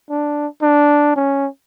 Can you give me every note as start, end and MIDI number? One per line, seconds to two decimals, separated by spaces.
0.10 0.47 62
0.62 1.14 62
1.16 1.48 61